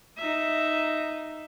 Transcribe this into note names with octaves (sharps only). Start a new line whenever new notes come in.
D#4 E5